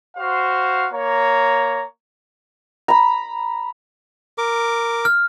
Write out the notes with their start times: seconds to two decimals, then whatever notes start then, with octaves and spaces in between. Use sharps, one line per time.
0.17 F#4 C5 F5
0.92 A#3 C#5 A#5
2.88 A#5 B5
4.38 A#4 D6
5.05 F6